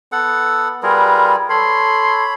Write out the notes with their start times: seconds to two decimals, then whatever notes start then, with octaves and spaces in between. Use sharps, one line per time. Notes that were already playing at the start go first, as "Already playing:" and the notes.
0.12 B3 A4 F#5
0.83 G3 F4 G#4 A#4 B4
1.50 A4 C#5 B5 C6